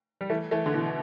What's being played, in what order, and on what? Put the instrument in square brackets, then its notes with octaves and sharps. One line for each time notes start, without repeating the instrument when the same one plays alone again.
[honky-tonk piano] G3
E3 A3
E3 A3
D3
B2 E3